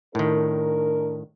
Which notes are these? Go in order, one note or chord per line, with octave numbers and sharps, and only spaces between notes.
A2 D#3 D4 D#4 A#4